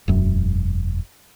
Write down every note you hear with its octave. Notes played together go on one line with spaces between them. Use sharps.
E1 F#2